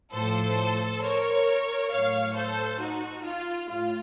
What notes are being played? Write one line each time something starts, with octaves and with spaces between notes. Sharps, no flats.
A2 F3 A4 C5
A#4 C#5
A2 F#3 C#5 F5
A4 C5
D#4 F#4
F4
A2 F4